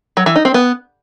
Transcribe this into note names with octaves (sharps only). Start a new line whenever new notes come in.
F#3
E3
D#4
C4
B3